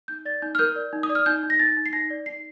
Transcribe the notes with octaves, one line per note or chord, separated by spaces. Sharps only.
D#4 G6
D5 A6
D#4 G6
F6
A#4 G6
D5
D#4
D#6
D5
F6
D#4 G6
D#4
A#6
D#4 A6
D#4
C7
D#4 A#6
D5
D#4 C7